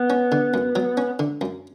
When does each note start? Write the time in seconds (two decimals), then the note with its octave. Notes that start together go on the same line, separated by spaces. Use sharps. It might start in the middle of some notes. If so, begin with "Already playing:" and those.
Already playing: B3
0.10 C#4
0.32 D3
0.54 F#2
0.76 F#3
0.97 C#4
1.19 D3
1.41 F#2